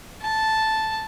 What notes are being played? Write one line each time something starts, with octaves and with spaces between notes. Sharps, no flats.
A5